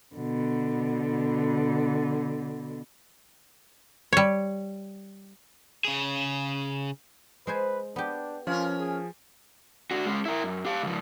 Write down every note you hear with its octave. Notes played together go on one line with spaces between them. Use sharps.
B2 D3
G3 C#5
C#3 G#4
G#3 B4 C5 G#5
B3 D4 G4
F3 C#4 F4 A#4
G#4
D4 F#4
G#3 C#4
E4 A#4
F#2
G4 F5
C#2 F3